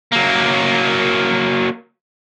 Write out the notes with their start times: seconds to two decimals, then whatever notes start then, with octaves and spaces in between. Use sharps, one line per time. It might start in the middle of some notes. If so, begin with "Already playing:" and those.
0.12 F#3 A#3